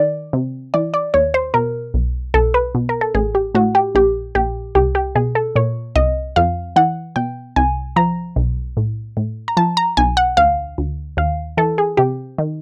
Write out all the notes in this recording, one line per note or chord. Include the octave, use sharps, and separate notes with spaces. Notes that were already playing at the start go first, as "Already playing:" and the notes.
Already playing: D#3 D5
C3
E3 D5
D5
D#2 C#5
C5
B2 A#4
B1
B1 A4
B4
B2
A#4
A4
A1 G#4
G4
A2 F#4
G4
A#1 G4
A#1 G4
C2 G4
G4
B2 G#4
A4
A#2 C#5
C2 D#5
F2 F5
E3 F#5
B2 G5
C2 G#5
F3 A#5
B1
A2
A2
A#5
F3 A5
A#5
B1 G#5
F#5
D2 F5
D2
D#2 F5
E3 A4
G#4
C3 G4
D#3